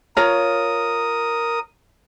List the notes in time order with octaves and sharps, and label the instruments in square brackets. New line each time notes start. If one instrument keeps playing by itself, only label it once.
[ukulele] F4 C#5 A#5 [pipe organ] A#4 D#6